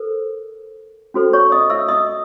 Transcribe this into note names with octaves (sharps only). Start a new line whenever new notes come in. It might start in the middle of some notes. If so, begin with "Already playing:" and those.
Already playing: A4 A#4 C5
C#4 F#4 A4 C5
C#5 C#6
D#5 D#6
E5 E6
D#5 D#6